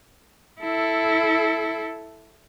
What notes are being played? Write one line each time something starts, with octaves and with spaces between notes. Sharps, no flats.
E4 A4